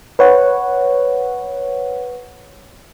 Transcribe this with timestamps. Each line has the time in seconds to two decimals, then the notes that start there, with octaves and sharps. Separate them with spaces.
0.19 B4 C#5 F#5